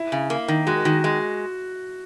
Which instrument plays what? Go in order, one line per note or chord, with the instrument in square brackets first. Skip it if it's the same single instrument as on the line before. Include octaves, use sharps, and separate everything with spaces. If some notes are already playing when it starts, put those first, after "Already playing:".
Already playing: [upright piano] E4
[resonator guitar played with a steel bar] C#3
A#3
D#3
[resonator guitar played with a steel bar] G#3 [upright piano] F#4
[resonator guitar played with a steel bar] D#3 [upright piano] F#4
[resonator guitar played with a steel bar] G#3